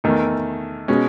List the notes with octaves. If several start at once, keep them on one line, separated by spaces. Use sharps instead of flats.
E2 D#3 A3 D#4
B2 G#3 C#4